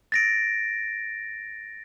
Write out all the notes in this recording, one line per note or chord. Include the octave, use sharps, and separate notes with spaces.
A6 A#6 D7